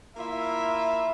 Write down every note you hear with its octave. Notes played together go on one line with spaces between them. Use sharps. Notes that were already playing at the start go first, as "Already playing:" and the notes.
A#3 E4 F4 E5